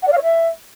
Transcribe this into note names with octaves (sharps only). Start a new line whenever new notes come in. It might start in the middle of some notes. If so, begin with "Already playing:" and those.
F#5
D5
F5
C#5
E5